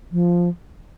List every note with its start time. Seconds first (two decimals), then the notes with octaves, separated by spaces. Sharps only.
0.12 F3